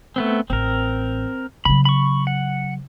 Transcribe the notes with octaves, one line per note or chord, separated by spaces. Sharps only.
A3 B3 C4
A1 C4 A#4
C#3 F#3 B5
B5 C#6
F#5